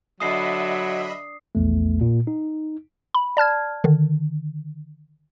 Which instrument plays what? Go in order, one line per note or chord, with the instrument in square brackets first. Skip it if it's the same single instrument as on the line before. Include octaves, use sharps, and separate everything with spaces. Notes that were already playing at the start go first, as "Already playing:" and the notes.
[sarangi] D3 [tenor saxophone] F#3 [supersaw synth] D#5 E5 B5 [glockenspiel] D#6 C7
[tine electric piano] A#1 E2 A3
A#2
D#4
[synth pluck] B5
D5 A5 F6 G#6
D3 D#3